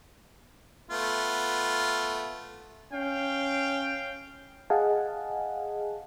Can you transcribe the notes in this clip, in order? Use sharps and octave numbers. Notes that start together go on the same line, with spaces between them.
A3 B3 F4
C#4 F5 G5
G#4 D#5 F5 F#5 G#5 A5